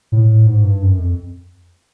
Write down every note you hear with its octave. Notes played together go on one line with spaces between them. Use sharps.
A2
G#2
G2
F#2
F2